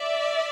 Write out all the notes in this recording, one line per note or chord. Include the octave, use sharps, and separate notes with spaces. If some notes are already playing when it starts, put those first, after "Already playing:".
Already playing: D5 E5